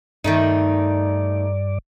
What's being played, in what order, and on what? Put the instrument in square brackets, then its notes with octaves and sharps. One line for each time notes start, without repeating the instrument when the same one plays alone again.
[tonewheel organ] G2 D5 [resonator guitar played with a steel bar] D#3 A3 D#4